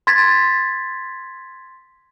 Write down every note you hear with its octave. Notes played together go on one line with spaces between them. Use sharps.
C6 G#6 A6 B6